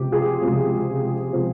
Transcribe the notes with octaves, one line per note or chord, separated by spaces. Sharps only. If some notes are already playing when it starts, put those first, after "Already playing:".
Already playing: C#2 C3 F3 G4
F4 G#4
C#2 C3 F3 C4
C3 F3 C4